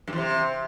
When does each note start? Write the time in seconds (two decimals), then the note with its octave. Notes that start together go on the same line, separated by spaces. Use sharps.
0.08 F#2
0.13 E2
0.18 C3